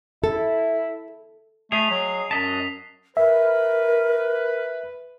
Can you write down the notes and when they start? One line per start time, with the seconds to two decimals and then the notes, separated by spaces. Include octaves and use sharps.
0.24 E4 A4
1.72 A3 G#4 D#5 C7 F7
1.91 F#3
2.31 F#2 F#3 D#5 A5 B6
3.17 A#4 B4 E5